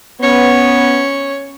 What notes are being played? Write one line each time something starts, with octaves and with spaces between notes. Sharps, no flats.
B3 C#4 C#5